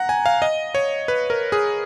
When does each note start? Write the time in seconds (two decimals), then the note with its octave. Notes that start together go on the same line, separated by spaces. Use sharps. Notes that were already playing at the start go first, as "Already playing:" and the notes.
Already playing: F#5 A#5
0.09 G#5
0.26 F5
0.42 D#5
0.75 C#5
1.08 B4
1.30 A#4
1.52 G#4